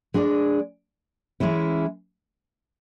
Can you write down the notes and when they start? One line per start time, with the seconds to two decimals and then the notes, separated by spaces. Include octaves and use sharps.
0.14 G#3 D4 G#4 D5
1.40 E3 G#3 C#4 E4